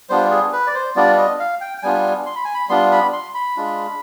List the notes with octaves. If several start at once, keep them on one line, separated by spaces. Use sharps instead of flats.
G3 B3 D4 F4 C5
G#4
B4
D5
C5
G3 B3 D4 F4 D5
D#5
F5
G5
G5
G3 B3 D4 F4 G#5
C6
B5
G#5
B5
G3 B3 D4 F4 C6
B5
C6
B5
G#3 D4 F4